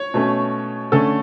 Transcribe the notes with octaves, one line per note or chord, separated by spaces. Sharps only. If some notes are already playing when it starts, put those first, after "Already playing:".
Already playing: C#5
B2 A3 C#4
D3 A3 C#4 A4